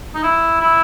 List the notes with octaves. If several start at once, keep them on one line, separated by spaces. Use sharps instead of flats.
D#4
E4
E4